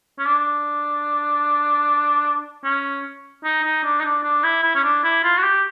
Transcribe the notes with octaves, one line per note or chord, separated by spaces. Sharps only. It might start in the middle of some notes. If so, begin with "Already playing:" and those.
C#4
D4
C#4
D#4
D#4
D4
D#4
D4
D4
E4
E4
C#4
D4
E4
F4
F#4
G4